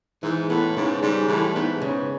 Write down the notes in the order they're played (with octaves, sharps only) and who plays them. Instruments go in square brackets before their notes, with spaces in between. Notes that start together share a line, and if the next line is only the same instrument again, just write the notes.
[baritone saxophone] G#2 [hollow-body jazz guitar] E3
[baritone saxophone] A2 [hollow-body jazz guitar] B3
[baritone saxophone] G#2 [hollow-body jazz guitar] C#3
[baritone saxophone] G#2 [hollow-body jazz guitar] G3
[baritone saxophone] A2 [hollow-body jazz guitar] E3
[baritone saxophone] G#2 [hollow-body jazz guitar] B3
[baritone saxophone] G#2 [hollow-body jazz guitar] C#3